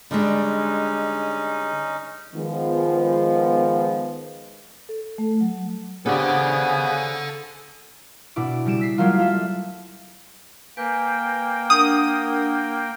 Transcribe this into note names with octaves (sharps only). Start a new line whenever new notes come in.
D3 G3 G#3 C#4 D#4
D#3 F3 G#3 B3
A4
A3
F#3
C#3 B3 C4 D4 G4 A4 F#5 G#5
B2 D4 E4 D6
C#3 G3 D7 E7
E6 B6 C7
F#3 G3 A3 A#3 F4
F4 A4 E5
A#3 B4 G5 G#5
D4 A#4 F#5 D#6